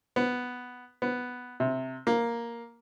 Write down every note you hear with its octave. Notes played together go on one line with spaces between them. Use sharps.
B3
B3
C3
A#3